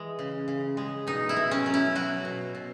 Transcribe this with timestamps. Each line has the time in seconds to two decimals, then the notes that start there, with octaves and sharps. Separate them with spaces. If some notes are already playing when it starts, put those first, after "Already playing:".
Already playing: E3 G#3
0.19 C#3
0.48 C#3
0.77 G#3
1.07 B2 D#4
1.29 E4
1.36 B2
1.51 C#4
1.66 F#3
1.74 E4
1.95 F#3 F#4
2.25 B2
2.55 B2